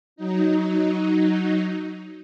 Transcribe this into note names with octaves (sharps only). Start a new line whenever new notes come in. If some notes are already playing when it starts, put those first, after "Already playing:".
F#3 D#4